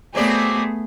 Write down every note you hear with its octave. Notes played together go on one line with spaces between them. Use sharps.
F#3 A3 B3 C4 G#4 D5